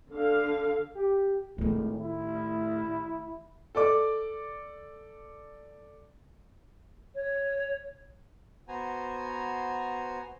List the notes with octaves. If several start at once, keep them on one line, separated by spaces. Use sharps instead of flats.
D3 F5
G4
G#1 A2 D#3 A3
E4
A4 D5 D6
C#5
B3 F#4 C5 G#5 A#5